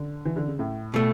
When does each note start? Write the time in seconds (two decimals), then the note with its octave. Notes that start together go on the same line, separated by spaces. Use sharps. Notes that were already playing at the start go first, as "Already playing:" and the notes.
Already playing: D3
0.25 E3
0.36 D3
0.47 C#3
0.59 A2
0.94 B2 A3